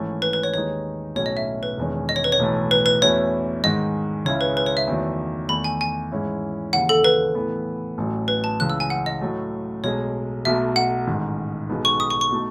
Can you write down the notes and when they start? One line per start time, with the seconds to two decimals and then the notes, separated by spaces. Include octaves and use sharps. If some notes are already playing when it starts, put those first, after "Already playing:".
Already playing: G#1 G#2 E3 A3 C#4
0.22 B4
0.33 B4
0.43 C#5
0.54 D#2 D#3 G#3 D#4 C#5
1.15 B1 A2 F#3 C#4 C#5
1.26 D#5
1.37 E5
1.63 B4
1.77 E1 E2 D#3 G#3 C#4
2.09 D#5
2.16 C#5
2.24 B4
2.32 C#5
2.39 B1 A2 E3 A3
2.71 B4
2.86 B4
3.02 E2 B2 A3 C#4 E4 C#5
3.64 G#2 D#3 G#3 D#5
4.25 C#2 C#3 G#3 C#4 E4 C#5
4.41 B4
4.57 B4
4.66 C#5
4.77 E5
4.87 E2 D#3 F#3 A3
5.49 E2 D#3 A3 B5
5.64 G#5
5.81 G#5
6.12 G#2 E3 G#3 C#4 E4
6.73 D#2 C#3 E3 F#5
6.89 A4
7.04 B4
7.35 A2 E3 B3
7.98 A1 A2 F#3
8.28 B4
8.44 A5
8.59 C#2 C#3 E3 F#6
8.70 E6
8.80 G#5
8.90 F#5
9.06 D#5
9.21 A2 F#3 A3
9.83 B1 B2 G#3 C#5
10.45 B1 B2 A3 E5
10.76 F#5
11.07 A1 G#2 D#3
11.69 B1 B2 G#3 B3 D#4
11.85 C#6
12.00 D#6
12.10 C#6
12.21 C#6
12.32 B2 A3 D#4